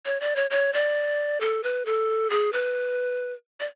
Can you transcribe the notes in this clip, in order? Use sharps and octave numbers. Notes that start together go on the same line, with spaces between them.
C#5
D5
C#5
C#5
D5
A4
B4
A4
G#4
B4
D5